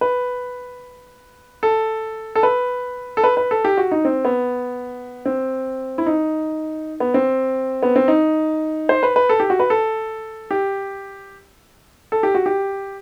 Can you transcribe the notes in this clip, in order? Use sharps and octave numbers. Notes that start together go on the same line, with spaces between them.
B4
A4
A4
B4
A4
B4
B4
A4
G4
F#4
D#4
C4
B3
C4
E4
D#4
B3
C4
B3
C4
D#4
C5
B4
B4
A4
G4
F#4
B4
A4
G4
A4
G4
F#4
G4